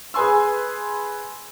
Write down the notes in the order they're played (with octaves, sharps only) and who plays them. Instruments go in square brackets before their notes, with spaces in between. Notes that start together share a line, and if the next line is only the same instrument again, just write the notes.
[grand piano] G#4 B4 G#5 C6 E6